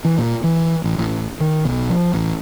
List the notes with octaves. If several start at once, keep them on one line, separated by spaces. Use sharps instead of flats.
E3
A#2
E3
A1
A1
D#3
B1
F3
A1